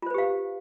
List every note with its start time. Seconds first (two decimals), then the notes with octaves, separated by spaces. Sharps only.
0.02 F4
0.06 C5
0.10 B4
0.14 G4
0.18 F5